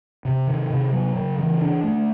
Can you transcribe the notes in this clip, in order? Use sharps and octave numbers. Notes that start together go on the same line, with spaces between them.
C3
D#3
C3
F#3
C#3
E3
D4
A3